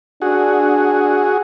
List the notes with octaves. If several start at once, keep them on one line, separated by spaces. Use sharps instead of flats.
D4 F#4 G#4